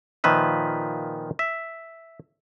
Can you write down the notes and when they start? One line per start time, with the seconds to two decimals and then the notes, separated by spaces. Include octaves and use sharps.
0.24 A#2 D#3 F3 B4 E5
1.39 E5